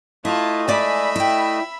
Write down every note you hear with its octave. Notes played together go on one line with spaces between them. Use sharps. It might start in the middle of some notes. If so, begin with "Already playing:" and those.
A3 E4 F4 D#5 A5
G#3 D5 E5 G#5 B5
E4 G5